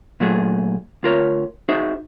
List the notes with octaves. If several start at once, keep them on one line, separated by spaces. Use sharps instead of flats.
A#2 F#3 A3 G#4
D2 F4 A#4 C#5
D#4 F#4 G#4 C5 E5